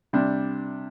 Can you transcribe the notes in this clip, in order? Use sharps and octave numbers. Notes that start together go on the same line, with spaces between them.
C3 G3 D4